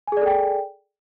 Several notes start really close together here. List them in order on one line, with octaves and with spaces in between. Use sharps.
G#5 G#4 D5 A4 G5